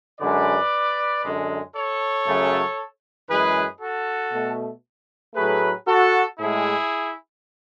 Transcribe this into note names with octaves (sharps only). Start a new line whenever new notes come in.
F#2 D3 G#3 B4 D5
F#2 D3 G#3
A4 C#5
F#2 C#3 F#3 A3
F#2 E3 G#3 G#4 B4
F#4 A4
B2 A3
A2 F#3 A3 G#4 B4
F#4 A4
A2 G#3 E4 G#4